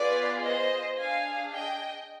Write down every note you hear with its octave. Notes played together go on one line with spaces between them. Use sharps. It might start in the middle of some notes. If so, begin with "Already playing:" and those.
Already playing: B3 F4 G#4 B4 D5
C5 D#5
D4 G#4 F5 G#5
D#5 G5